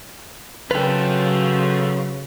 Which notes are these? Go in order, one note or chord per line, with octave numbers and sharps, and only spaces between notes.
C#3 F#3 F4 A4 B4 G5